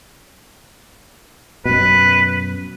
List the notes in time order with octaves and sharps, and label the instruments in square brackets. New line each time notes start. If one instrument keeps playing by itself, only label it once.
[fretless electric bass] F#2 B2 [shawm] B4